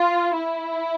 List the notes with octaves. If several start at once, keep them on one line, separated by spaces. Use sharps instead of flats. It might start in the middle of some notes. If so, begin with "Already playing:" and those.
Already playing: F4
E4